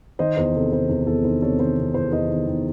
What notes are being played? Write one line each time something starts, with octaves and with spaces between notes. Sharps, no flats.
D#3 C5 D#5
E2 C5
C3 A4
C3 C5
E2
E2 A4
D#3 C5
C3 A4 C#5
D#3 C5
C3
E2 C5
E2 C5 D#5
D#3
D#3